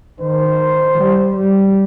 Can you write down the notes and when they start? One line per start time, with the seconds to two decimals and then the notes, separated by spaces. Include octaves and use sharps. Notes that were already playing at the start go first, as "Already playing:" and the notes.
0.20 D#3 C5
0.98 G3
1.35 G3